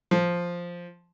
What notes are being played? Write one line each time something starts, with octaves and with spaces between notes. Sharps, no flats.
F3